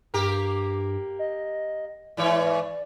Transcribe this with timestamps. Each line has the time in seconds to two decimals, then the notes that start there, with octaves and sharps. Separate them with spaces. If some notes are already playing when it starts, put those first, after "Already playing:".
0.14 G2 A#3 G4 A#4
1.19 D#5
2.17 G#2 E3 C#5 D5